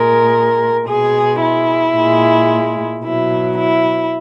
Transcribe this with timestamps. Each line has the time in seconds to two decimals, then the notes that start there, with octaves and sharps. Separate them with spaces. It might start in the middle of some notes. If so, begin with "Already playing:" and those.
Already playing: A#2 G#3 A#4
0.87 B2 G#3 G#4
1.41 E4
1.94 A#2 G#3
3.02 B2 F#3 E4
3.57 E4